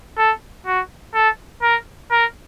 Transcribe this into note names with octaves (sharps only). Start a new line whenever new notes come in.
A4
F#4
A4
A#4
A#4